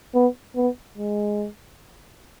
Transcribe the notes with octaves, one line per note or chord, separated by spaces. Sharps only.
B3
B3
G#3